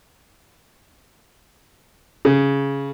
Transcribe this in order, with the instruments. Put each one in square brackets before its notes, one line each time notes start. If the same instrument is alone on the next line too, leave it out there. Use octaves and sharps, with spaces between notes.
[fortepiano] C#3